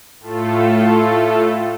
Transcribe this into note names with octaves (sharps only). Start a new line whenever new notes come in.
A2 A3 F4 A4